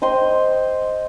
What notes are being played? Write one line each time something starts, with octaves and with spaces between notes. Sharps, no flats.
C5 D#5 G5 C6